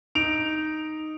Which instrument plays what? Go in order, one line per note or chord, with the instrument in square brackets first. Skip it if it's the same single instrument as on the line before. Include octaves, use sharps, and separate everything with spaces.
[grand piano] D#4 D7 F7